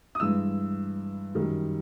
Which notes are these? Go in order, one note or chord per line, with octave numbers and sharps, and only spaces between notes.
D#6
G2 E3 G#3 E6
F#2 D#3 G3